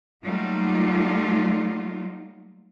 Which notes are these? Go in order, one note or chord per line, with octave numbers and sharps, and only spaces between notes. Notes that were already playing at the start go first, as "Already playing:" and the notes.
F#3 G3 A3 A#3 D#4 F4